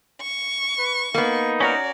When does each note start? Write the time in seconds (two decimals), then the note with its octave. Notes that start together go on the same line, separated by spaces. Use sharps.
0.22 C#6
0.79 B4
1.14 A#3 B3 D#4
1.60 C#4 F#4 A#4 D5